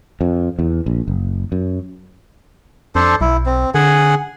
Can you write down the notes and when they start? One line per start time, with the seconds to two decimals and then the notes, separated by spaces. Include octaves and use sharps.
0.21 F2
0.59 E2
0.86 A#1
1.08 F#1
1.52 F#2
2.95 F2 D4 A4 C5
3.21 B1 E4
3.46 C4
3.75 D3 G#4 F#5 G#5